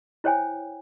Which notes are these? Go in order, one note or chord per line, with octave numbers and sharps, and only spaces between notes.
E4 C5 C#5 G5 G#5